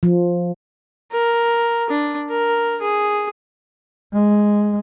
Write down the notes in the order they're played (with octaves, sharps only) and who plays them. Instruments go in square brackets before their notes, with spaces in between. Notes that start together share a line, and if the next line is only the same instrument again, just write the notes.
[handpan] F3
[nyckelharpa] A#4
D4
A#4
G#4
[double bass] G#3